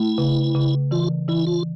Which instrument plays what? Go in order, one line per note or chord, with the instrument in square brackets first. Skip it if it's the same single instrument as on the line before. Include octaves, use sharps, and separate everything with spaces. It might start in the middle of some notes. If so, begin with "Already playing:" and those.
Already playing: [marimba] A3 [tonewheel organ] E4
[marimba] C#3
C#3
[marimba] E3 [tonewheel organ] F4
[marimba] E3 [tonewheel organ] E4
[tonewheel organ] F4